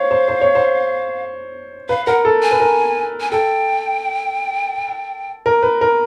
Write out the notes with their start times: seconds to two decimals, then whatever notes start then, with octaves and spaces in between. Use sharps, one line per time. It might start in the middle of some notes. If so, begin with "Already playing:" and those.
Already playing: C5 C#5 F5
0.11 C5
0.28 C5
0.41 C#5
0.55 C5
1.89 B4 F5
2.06 A#4 F#5
2.25 A4
2.43 G#5
2.51 B4
2.60 A#4
3.21 G#5
3.31 A4 G5
5.46 A#4
5.63 B4
5.81 A#4